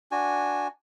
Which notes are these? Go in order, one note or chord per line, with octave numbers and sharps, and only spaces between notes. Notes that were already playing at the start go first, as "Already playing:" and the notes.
D4 F#4 G#5